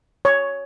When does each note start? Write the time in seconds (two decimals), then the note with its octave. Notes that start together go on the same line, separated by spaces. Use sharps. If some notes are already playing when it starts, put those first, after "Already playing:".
0.25 C#5